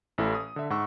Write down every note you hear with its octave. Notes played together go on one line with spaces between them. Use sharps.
A1 E4 A4
D#6
D3 E5
G#2 F#5 C#6 E6